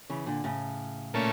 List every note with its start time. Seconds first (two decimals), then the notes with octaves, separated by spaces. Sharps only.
0.10 C#3 E3
0.26 A#2 D3
0.44 A2 C#3
1.14 A#2 A3 C#4